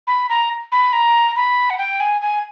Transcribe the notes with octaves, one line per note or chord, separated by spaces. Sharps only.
B5
A#5
B5
A#5
B5
F#5
G5
G#5
G#5